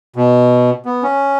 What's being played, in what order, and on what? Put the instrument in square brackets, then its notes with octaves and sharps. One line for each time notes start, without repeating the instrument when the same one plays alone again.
[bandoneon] B2
B3
C#4